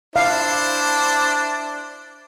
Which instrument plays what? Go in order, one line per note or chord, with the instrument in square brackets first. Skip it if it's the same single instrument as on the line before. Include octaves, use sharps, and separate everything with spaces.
[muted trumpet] D4 [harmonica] E4 C5 [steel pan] F5